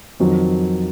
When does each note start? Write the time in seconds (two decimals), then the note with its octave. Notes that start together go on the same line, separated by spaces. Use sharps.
0.20 F2 D#3 F#3